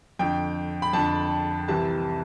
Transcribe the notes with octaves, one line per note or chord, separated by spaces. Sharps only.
F2 D3 G5
B5
F2 D3 A5
C2 C3 E3 A5